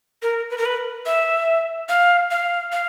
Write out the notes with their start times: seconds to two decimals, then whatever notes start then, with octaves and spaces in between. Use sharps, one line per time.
0.22 A#4
0.50 B4
0.58 A#4
0.65 B4
1.06 E5
1.89 F5
2.31 F5
2.72 F5